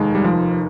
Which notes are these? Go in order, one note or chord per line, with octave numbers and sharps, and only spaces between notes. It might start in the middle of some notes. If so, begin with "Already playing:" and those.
Already playing: F1 D#2 D#3 G#3
G3
F3